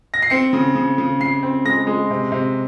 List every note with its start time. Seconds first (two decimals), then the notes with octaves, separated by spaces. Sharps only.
0.14 A#6
0.22 C7
0.30 C4 C#7
0.53 C#3
0.75 C#3
0.98 C#3
1.20 C#3 C7
1.43 C4
1.65 G#3 A#6
1.87 G#3
2.10 C3
2.32 C3